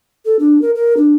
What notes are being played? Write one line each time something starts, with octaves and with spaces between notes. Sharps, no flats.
A4
D4
A#4
A#4
D4